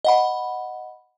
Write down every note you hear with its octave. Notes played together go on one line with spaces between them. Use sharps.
D#5 F#5 B5